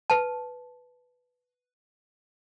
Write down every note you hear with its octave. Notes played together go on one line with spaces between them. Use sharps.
B4 A5